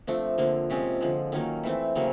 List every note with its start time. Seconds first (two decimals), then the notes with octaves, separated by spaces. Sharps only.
0.07 F3 A3 C4 D4
0.38 D3 F3 A#3
0.70 C3 F3 G#3 C4 C#4
1.01 D3 F3 G#3
1.32 D#3 F#3 A#3 C#4
1.64 E3 A3 C4
1.96 C#3 F#3 A#3 C4